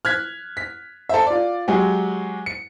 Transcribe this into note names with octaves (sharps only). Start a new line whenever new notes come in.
F6 F#6 G#6 B6
B6
A4 C5 E5
F4 D5
F#3 G#3 F#4 G4
C#7